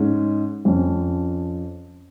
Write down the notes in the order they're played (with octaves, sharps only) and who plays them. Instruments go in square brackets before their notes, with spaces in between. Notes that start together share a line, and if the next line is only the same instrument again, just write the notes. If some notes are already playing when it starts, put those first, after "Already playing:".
Already playing: [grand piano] G#2 G#3 C#4
F2 F3 C#4